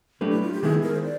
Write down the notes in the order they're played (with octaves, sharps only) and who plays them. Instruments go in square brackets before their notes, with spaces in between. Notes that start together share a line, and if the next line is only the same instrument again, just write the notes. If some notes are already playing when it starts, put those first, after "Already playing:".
[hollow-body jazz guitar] F#3 A3 D4 G4 B4
[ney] E4
F4
G4
[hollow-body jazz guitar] D#3 G#3 B3 E4 [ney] G#4
[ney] A#4
C5
D5